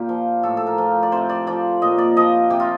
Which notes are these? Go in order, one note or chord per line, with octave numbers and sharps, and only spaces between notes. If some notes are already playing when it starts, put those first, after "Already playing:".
Already playing: A#2 F4 G4
F3
A2 A4
A4
A#4
F3
D5
C3 C5
D5
F3 D5
A#2 D#5
D5
F3 D#5
C3 G4
F4